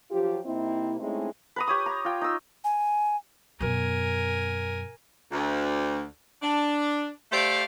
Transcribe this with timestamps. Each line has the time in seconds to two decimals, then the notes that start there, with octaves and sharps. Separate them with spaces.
0.10 F3 F#3 F4 G4
0.45 C3 A#3 C4 D#4 E4
0.99 G#3 A3 C4 C#4 D#4 E4
1.56 B4 A#5 D#6
1.67 G4 C#5 D#6
1.86 A#5
2.05 F4 G5
2.21 D#4 E6
2.64 G#5
3.60 F#2 B2 A#4 G#5
5.32 D2
6.42 D4
7.32 A3 G4 C5 D5 E5 F5